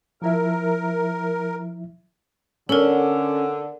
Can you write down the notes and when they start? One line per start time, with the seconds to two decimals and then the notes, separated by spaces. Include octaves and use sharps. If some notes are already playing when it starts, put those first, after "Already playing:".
0.22 F3 E4 A#4 E5
2.69 D3 C#4 A4 A#4